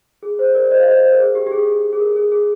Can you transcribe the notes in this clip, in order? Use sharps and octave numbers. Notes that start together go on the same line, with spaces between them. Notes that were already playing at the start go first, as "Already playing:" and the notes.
G#4
C5
A#4 D5
C5 D#5
F5
C5 D#5
C5
A#4
G#4
G4
G4
G#4
G#4
A#4
G#4
G#4